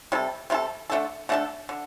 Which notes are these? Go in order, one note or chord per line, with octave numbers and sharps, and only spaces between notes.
C3 G3 F4 A4
C3 G3 F4 A4
D3 A3 D4 A4
D3 A3 D4 A4
D3